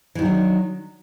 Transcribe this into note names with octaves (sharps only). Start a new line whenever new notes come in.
D#3 E3 F#3 D4